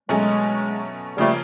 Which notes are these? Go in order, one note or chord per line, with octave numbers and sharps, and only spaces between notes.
B2 F#3 G#3 A3 C#4
C#3 F3 G3 A3 A#3